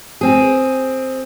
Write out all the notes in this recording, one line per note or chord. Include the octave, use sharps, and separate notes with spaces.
C4 G#4